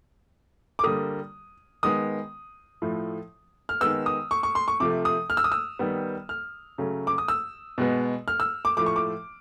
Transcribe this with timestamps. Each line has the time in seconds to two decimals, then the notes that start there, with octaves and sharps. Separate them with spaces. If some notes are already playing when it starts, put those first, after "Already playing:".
0.79 D6
0.84 D3 G3 A#3 D#6
1.83 D#3 G#3 B3 D#6
2.82 A2 F3 A3
3.69 F6
3.81 D#3 G#3 B3 E6
4.06 D#6
4.31 C#6
4.43 C#6
4.55 C6
4.68 C#6
4.80 C3 F3 A3 D6
5.05 D#6
5.30 F6
5.37 E6
5.44 D#6
5.52 E6
5.79 D#3 G3 B3
6.29 F6
6.78 C#3 F#3 A3
7.07 D6
7.18 D#6
7.28 E6
7.78 B2 G#3 B3
8.28 F6
8.40 E6
8.65 D6
8.77 A2 F3 A3 D6
8.86 C#6
8.96 D6